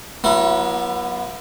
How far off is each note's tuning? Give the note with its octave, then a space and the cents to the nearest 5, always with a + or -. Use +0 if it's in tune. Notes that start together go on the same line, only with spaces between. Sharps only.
F#3 +0 B3 -35 E4 +30